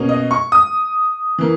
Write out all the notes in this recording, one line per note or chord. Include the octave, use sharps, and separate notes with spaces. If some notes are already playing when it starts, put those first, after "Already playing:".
Already playing: B2 A#3 C#4
D#5
C#6
D#6
E3 A#3